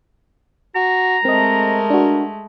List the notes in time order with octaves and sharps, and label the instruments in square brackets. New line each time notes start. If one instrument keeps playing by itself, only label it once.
[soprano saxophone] F#4 [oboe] A#5
[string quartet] G#3 A3 [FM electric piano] C4 D#5 [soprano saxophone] A#4
[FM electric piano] D4 F#4